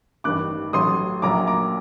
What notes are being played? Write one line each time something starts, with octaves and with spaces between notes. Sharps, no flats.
A1 G2 D#3 D6 F#6
A1 A2 F#3 C6 D#6
A#1 A#2 F#3 A#5 D6
A#5 D6